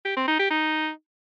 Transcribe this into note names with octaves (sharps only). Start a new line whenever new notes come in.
G4
C4
D#4
G4
D#4